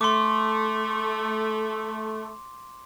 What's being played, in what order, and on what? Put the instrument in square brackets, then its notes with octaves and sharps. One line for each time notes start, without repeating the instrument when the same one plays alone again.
[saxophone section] A3 [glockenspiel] C6 D6